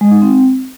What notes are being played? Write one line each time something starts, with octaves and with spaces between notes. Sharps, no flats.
G#3
D#4
C4